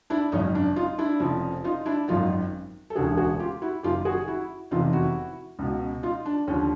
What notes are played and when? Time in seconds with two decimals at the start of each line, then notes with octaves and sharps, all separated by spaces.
0.10 D4 E4
0.32 G#1 F#2 C#3 C#4 D#4
0.55 D4
0.76 D#4 F4
0.98 D4 E4
1.20 F1 F2 C#3 F3
1.64 D#4 F4
1.86 D4 E4
2.08 G#1 F#2 D#3 D#4 F4
2.90 A4
2.96 E1 D2 C#3 F#4 G#4
3.17 F#4 G#4
3.39 F4 G4
3.62 E4 F#4
3.83 F#1 F#2 D#3 F4 G4
4.05 F#4 G#4
4.27 E4 F#4
4.71 F1 E2 C3 D#3 D#4 F4
4.93 E4 F#4
5.59 C#2 B2
6.03 D#4 F4
6.25 D4
6.47 D#2 D3 F3 C#4